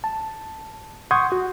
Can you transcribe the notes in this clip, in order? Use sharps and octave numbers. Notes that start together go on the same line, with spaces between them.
A5
F#5 C6 C#6 D#6 G6 G#6
F#4